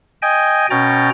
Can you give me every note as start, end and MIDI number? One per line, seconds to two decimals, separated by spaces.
0.22 0.66 75
0.22 0.66 79
0.22 0.66 80
0.70 1.10 47
0.70 1.10 61
0.70 1.10 79
0.70 1.10 82
0.70 1.10 93